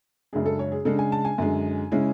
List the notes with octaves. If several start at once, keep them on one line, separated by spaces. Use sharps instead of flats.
F#2 C#3 G#3 D4 G#4
A4
C#5
G#4
C#3 G#3 D4 A4
G#5
A5
G#5
F#2 D3 G#3
C#3 G#3 C#4 E4